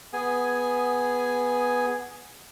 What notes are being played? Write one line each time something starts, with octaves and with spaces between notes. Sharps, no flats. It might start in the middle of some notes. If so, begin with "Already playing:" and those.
B3 G#4 G#5